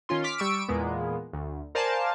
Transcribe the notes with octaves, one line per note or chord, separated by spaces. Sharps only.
D#3 C#4 F4 C6
D6 F6 B6
G3 C#6 E6 D7
E2 A#2 G#3 A#3 B3
D2
A#4 C5 D5 F5 G#5 A5